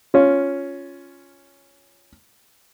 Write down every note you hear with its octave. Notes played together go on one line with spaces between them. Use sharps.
C#4 F4